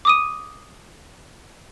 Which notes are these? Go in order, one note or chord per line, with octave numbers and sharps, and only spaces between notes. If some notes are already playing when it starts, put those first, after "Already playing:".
D6 D#6 D#7